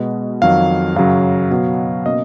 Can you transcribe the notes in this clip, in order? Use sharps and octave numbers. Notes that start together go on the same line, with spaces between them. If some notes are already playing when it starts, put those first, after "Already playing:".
Already playing: B2 G#3 B3 D#5
F2 D#3 F#3 F5
F#2 C#3 F#3 F5
B2 F#3 B3
B2 A#3 C#4 D#5